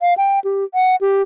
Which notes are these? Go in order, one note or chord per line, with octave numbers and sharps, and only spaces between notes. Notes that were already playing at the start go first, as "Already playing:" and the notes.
F5
G5
G4
F#5
G4